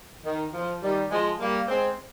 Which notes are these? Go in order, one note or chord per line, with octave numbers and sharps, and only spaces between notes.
D#3
F3
D#3 G3
F3 G#3
G3 A#3
G#3 C4